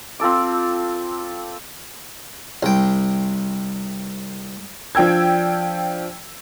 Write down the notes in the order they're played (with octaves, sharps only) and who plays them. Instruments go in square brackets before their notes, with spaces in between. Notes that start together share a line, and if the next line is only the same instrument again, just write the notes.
[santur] C4 F4 A4 D6
[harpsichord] C2 G5
[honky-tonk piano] F3 D4 G5 E6 G#6